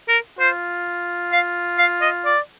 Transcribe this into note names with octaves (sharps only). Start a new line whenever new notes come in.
A#4
F4 C5
F5
F5
D#5
D5